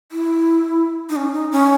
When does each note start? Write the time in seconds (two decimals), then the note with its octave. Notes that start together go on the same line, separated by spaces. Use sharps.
0.12 E4
1.10 D#4
1.16 C#4
1.33 D#4
1.52 C#4